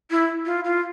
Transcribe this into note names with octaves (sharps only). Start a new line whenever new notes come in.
E4
F4
F4